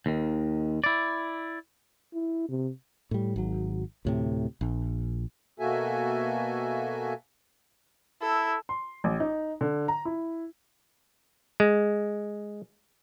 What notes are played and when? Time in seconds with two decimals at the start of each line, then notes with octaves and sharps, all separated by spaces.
0.06 D#2 D#3
0.84 E4 D5
2.13 E4
2.49 C3
3.11 A2 G3
3.36 G#1 F#3
4.05 D2 A2 C3
4.61 A#1
5.60 B2 A#3 F#4 A4 E5 G#5
8.22 E4 A4
8.69 C6
9.04 A1
9.20 D#4
9.61 D3
9.88 A#5
10.05 E4
11.60 G#3